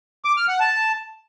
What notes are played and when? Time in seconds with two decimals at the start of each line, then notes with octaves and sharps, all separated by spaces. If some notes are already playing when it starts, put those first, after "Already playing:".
0.25 D6
0.37 F6
0.48 F#5
0.60 A5